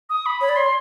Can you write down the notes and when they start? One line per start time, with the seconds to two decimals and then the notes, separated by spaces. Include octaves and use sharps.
0.10 D#6
0.26 B5
0.41 C#5 B5
0.49 D5
0.56 C#5 C6